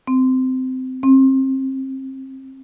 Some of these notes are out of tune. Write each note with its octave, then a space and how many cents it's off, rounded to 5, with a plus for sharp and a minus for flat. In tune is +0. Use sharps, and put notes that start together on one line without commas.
C4 -20
C4 +30